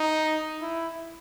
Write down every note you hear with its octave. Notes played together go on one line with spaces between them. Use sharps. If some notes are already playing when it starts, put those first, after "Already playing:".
Already playing: D#4
E4